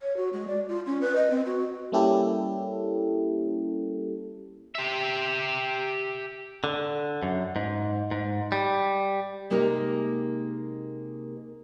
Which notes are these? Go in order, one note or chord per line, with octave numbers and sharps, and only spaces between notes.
C#5
F#4
G#3
D5
F4
C#4
B4
D#5
C4
F#4
G3 A#3 C#4 E4 G4 A4
G4 E5
D3
F#2
G#2
G#2
G3
C3 G#3 A#3 D#4 G4 A#4